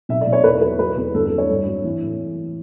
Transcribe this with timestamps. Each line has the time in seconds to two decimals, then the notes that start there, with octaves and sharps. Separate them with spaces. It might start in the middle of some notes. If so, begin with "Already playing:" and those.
0.09 B1 E5
0.21 D5
0.27 B1
0.33 C#5
0.44 E2 B4
0.61 F#3 B4
0.79 F#3 B4
0.97 E2
1.14 G1 A4
1.25 A4
1.32 F#3
1.38 C#5
1.50 G2
1.66 F#3
1.84 E3
2.02 A2